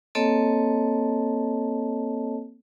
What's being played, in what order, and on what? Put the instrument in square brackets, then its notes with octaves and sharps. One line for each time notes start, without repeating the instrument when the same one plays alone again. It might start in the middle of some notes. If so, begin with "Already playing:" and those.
[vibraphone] A#3 C4 A4 C#5 D#5 A5